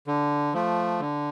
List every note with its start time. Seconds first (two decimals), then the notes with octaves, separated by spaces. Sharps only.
0.07 D3
0.54 F3 A3
1.00 D3